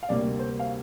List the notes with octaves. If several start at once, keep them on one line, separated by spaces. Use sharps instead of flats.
F5
D2 C3 G3 A#3 D5
C5
F5